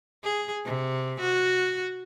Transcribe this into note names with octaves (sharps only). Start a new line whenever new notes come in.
G#4
C3
F#4